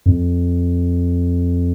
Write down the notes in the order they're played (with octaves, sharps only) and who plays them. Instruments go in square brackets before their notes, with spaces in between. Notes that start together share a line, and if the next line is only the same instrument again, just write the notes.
[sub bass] F2